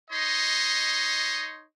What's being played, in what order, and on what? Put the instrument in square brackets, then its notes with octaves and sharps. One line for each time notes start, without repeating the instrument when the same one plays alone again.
[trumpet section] D#4 C#5 D#5 C6